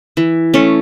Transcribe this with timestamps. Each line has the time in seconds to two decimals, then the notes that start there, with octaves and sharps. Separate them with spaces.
0.17 E3
0.54 A3 C#4